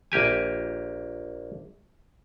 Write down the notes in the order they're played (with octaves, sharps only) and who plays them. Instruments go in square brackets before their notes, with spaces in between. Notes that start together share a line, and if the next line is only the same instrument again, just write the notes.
[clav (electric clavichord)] A#1 A#3 G4 G#5